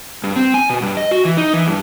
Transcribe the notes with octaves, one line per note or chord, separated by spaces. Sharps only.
G2
C4
G#5
B2
G2
D#5
F#4
E3
D#4
E3
G2